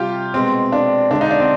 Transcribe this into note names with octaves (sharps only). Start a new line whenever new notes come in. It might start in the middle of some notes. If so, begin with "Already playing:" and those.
Already playing: C3 G3 F4 G4
B2 G#3 C4
D4
D3 G#3 D4
D#4
D4
C4